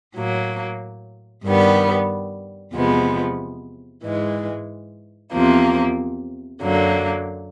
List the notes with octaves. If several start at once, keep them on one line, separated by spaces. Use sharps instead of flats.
A2 F#3 A#3
G2 D#3 G3 B3
E2 C3 F3 G#3 B3
G#2 E3 G#3
E2 C3 F3 A#3
F#2 D3 F#3 A#3